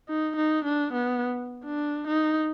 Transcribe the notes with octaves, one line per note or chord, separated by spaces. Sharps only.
D#4
D#4
D4
B3
D4
D#4